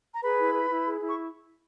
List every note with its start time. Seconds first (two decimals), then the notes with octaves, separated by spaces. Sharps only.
0.14 A#5
0.23 G#4 B4 B5
0.38 E4
0.54 B4
0.70 E4
0.85 G#4
1.00 E4
1.09 C#6